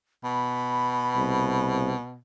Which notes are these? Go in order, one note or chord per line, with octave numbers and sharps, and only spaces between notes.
B2 B5
C2